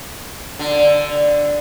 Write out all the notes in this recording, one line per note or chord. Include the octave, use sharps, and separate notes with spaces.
D3